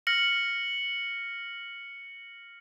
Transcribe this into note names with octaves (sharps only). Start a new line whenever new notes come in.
F6 A#6 C#7 F#7